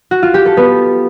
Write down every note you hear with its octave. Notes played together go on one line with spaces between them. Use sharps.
F#4
F4
G4
A4
B3